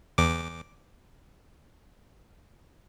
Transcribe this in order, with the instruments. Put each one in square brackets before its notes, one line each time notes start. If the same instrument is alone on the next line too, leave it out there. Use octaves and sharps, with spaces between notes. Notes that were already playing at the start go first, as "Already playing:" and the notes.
[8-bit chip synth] E2 D6